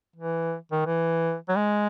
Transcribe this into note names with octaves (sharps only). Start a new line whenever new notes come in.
E3
D#3
E3
F#3
G#3